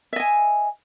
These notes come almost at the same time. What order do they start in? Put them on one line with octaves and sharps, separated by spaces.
E5 D#5 G#5